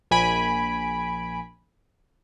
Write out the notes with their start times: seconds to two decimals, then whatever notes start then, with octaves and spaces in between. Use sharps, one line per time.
0.11 A#1 G#5 B5 D7